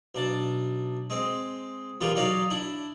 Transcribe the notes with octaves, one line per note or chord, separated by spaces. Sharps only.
B1 D4 A5
G#3 C4
E2 A#2 E3 F4 G4
F#3 D#4 C#5 D5 F5
D4 E4